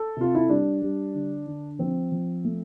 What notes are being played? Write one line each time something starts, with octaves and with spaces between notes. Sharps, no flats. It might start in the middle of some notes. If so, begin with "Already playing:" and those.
Already playing: A4
C3 F4
E4
G3 D4
G3
D3
D3
F3 C4
F3
A3